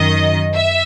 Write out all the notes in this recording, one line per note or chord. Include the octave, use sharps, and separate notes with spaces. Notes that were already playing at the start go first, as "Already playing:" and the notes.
Already playing: F#2 D#3 D#5
E5